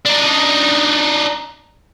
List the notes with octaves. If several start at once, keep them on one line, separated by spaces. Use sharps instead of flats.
D4 D#4